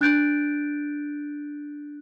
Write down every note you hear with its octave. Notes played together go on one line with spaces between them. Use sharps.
D4 F#6 G6 A6 D7